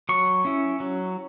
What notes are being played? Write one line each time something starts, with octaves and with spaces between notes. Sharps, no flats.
F#3 C#6
C#4 E4
F#3